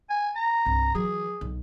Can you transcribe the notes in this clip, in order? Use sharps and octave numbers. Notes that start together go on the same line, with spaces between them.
G#5
A#5
C2 G2
E3 F#3 G#4
B1